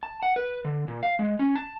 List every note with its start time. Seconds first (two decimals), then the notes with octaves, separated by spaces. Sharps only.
0.03 A5
0.23 F#5
0.36 B4
0.65 D3
0.88 A#2
1.03 F5
1.19 G#3
1.39 C#4
1.56 A5